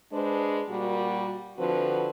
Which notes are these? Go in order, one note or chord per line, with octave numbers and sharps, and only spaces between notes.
G#3 D4 B4 C5
A#2 G3 A#3 F#4
D3 F3 C4 F#4 B4